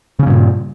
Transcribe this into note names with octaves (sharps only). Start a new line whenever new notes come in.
G2 A#2 C#3 C#4